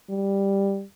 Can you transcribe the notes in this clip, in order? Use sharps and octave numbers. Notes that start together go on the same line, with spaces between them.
G3